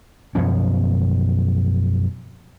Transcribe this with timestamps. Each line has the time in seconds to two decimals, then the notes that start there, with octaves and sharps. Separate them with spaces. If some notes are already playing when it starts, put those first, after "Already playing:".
0.35 F#2 B2 F3 C#4